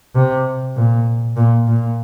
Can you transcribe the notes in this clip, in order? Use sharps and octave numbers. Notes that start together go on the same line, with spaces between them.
C3
A#2
A#2
A#2